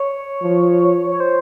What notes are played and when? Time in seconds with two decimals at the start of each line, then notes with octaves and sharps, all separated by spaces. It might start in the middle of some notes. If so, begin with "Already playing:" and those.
Already playing: C#5
0.43 F3
1.11 C#5
1.20 C5